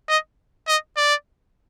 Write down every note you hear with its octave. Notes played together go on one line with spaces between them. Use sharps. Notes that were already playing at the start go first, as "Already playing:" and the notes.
D#5
D#5
D5